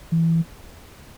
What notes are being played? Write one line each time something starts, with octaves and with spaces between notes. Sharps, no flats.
E3